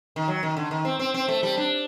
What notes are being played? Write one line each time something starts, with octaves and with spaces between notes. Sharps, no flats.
D#3
F#3
D#3
D3
D#3
C4
C4
C4
A3
G3
D4